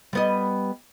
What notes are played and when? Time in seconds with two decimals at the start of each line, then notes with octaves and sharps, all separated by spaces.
0.13 G3 B3 D#5